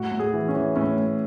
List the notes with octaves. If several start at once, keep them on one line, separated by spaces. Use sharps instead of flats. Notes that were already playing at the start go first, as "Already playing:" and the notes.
Already playing: A2 F#4
A2
G#4
E3
C#4
E3
A2 C#4
A2